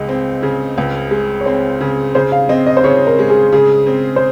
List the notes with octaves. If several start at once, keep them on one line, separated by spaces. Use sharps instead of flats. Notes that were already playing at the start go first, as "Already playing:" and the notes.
Already playing: C#2 G#3 D#5
C4
C#3
C#2
G#3
C#5
C4 C5
C#3
C#3 C5
F5
C4 D#5
D#5
C5
C#3 C#5
A#4
G#3
G#4
C#3 G#4
C4
C5